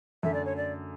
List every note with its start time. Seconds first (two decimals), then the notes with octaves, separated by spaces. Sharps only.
0.23 F#2 D3 A3 E5
0.34 D5
0.45 C#5
0.57 D5